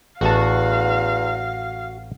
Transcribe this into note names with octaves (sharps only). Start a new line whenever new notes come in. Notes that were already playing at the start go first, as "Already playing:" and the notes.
A1 E2 F#4 F5 A5